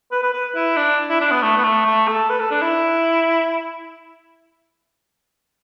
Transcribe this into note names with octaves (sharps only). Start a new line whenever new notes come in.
B4
B4
B4
E4
D4
E4
D4
B3
A3
B3
A3
A3
A4
B4
A4
D4
E4